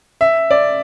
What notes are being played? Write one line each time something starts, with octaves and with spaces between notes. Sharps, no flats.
E5
D5